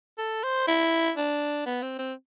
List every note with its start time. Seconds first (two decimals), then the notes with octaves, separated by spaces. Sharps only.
0.18 A4
0.43 C5
0.67 E4
1.17 D4
1.66 B3
1.82 C4
1.99 C4